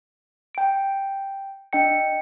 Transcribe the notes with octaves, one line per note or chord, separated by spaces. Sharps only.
G5 D7
D4 D#5 G5 C#7